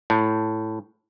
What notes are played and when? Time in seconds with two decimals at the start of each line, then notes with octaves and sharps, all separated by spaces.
0.10 A2